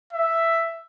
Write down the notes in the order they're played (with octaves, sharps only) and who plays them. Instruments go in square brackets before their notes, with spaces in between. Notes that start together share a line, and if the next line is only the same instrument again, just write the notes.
[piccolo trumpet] E5